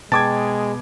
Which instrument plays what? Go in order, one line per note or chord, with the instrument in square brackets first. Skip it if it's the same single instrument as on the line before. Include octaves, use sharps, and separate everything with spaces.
[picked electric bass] B2 [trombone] G#3 [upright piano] G5 D6 G#6 [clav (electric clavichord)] A5